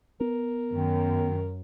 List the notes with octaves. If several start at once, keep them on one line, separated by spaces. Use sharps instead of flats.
B3 A#4
F#2 D#3